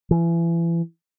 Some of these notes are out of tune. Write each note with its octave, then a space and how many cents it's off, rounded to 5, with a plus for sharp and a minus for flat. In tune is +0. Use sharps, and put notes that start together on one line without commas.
E3 +30